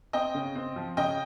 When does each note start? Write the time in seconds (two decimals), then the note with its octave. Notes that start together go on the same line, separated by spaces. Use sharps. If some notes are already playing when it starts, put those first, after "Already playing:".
0.13 C4 D#5 G5
0.34 C#3
0.55 C4
0.76 F3
0.97 C#3 D#5 G5